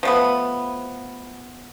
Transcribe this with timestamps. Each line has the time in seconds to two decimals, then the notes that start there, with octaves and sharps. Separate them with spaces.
0.03 F3 A3 B3